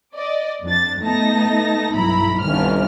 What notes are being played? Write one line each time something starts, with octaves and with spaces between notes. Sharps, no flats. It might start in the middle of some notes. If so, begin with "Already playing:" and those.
D5 D#5
F2 D4 A6
A3 B3 D#4 A5 A#6
B1 G2 E4 A#5 B5
G1 C2 D#3 C#4 F6